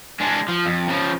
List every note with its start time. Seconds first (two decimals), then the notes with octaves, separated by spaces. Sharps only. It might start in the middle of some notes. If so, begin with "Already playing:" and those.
0.20 G#3 D4
0.48 F3
0.66 F2
0.88 C#3 F3